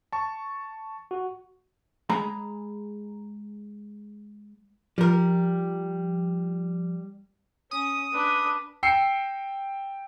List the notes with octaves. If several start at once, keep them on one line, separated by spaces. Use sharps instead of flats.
A5 C#6
F#4
G#3 G#4 A#5 B5
F3 G3 A#4
C#4 D#6
D4 B4
G5 E6 C7 C#7